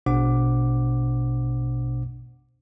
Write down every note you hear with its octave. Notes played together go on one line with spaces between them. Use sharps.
A#1 B2 D4 C5 F#5 D6